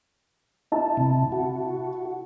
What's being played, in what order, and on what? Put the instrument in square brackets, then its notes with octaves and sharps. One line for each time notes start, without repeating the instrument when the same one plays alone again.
[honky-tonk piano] E4 A5
[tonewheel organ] C3
F#4